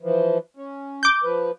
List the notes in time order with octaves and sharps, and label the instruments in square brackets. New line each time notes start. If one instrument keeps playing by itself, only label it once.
[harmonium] E3 F3
C#4
[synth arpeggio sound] D6 G6
[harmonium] F3 B4